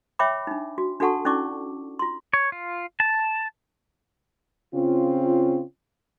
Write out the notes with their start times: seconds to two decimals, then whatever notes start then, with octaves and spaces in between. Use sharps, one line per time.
0.19 C#5 E5 G5 B5 D6
0.47 D4 D#4
0.78 F#4
1.00 D4 F#4 A4 F#5 A5 C#6
1.25 C#4 D#4 E4 D5 C#6 D6
1.99 F4 C6
2.34 C#5
2.52 F4
3.00 A5
4.74 C#3 C4 C#4 F4